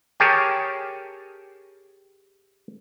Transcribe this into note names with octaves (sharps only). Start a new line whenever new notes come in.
G4 G#4 A#4 C#5 G5 A5